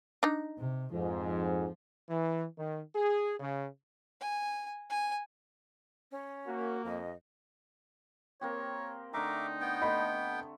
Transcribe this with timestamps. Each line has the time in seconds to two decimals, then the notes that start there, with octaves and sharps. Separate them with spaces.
0.23 D4 D#4
0.59 C3
0.92 F2 G#2 F3
2.09 E3
2.58 D#3
2.95 G#4
3.40 C#3
4.21 G#5
4.90 G#5
6.11 C#4
6.47 A#3 F#4
6.84 F2 D#5
8.41 A#3 C4 G4 C#5
9.14 D3 A3 D#4 E5 F5 A#5 D6
9.61 B3 G5
9.81 A3 D#5 B5 C6